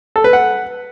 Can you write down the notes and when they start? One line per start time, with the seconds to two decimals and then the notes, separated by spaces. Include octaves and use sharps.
0.16 A4
0.24 B4
0.33 F#5